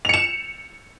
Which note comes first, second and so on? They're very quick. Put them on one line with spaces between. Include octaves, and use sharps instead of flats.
F7 C#7 E7